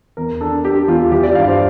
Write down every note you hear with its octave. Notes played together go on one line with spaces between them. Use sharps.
E2 A#4
D4 A4
D4 G4
E2 F4
E3 G4
D5
G2 F5
C5